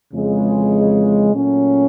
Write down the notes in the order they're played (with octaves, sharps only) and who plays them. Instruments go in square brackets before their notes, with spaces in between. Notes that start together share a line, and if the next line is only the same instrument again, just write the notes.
[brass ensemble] F2 C#3 E3 G#3
A#2 F#3 A3 C#4